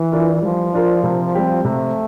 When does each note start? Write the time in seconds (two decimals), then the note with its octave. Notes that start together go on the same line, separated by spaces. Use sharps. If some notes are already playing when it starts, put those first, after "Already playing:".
Already playing: E3
0.12 D4 F4 A#4
0.42 F3 G3
0.74 D4 F4 A#4
1.03 C3
1.35 G3 C4 G4
1.65 C3 A3